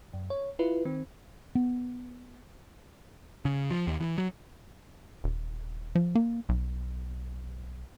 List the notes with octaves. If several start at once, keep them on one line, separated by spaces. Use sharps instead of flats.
F#2
C#5
E4 F4 B4
D#3 C4
B3
C#3
F3
D#2
E3
F#3
D#1
F3
A#3
B1